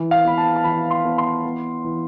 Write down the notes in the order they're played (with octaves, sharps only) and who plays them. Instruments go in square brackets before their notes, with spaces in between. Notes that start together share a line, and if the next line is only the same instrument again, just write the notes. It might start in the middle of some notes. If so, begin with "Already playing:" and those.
Already playing: [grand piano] E3
F5
B3 B5
A5
A5
E3 B5
C6
B3
C6
B3
E3